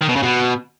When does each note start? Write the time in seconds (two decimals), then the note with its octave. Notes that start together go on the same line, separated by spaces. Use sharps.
0.01 D#3
0.08 B2
0.16 C#3
0.23 B2